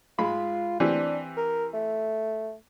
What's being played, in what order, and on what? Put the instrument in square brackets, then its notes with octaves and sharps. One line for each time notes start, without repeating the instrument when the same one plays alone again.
[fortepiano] G#2 G#3 B5 [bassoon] F4
[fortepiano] E3 C4 G4 [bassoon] D4
[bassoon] A#4
A3